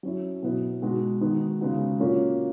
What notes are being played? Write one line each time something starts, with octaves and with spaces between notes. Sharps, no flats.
F#3 C#4 E4
B2 F#3 B3 E4
B2 G#3 D#4 F#4
D#3 G#3 B3 D#4 F#4
C#3 G#3 B3 D#4 F#4
A#2 A#3 C#4 F#4